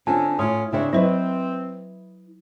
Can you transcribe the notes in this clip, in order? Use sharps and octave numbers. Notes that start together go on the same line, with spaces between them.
D3 C4 C#4 F4 G#5 A5
A2 C#4 F4 C#5 D#6
C#3 C4 D4 E4 C#5
F#3 C4 E4 B4 C5 D#5